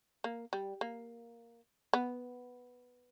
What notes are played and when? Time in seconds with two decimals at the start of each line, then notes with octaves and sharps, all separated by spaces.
0.24 A#3
0.53 G3
0.81 A#3
1.93 B3